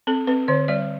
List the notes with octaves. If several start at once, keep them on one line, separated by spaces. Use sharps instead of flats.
C4 A4
C4 B4
D3 C#5
G3 D5